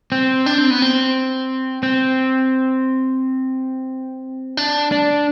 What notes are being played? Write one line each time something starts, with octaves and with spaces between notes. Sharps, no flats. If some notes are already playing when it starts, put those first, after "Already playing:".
C4
D4
C4
B3
C4
C4
D4
D4